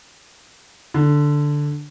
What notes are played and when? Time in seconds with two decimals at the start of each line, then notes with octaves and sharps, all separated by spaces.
0.94 D3